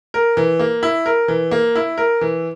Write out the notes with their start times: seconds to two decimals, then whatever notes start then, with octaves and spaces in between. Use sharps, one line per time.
0.14 A#4
0.37 E3
0.59 A#3
0.83 E4
1.06 A#4
1.28 E3
1.51 A#3
1.75 E4
1.98 A#4
2.21 E3